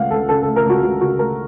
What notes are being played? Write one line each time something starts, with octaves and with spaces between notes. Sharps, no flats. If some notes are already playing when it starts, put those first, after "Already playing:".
Already playing: C#2 C#3 A3 F5 F#5
C#2 A4
C#3 A4
A4
A3
A#4
C#2 F#4
C#2 F#4
C#3 F#4
A3 A#4